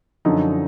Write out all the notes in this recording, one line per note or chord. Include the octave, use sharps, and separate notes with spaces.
F#2 D3 F3 D#4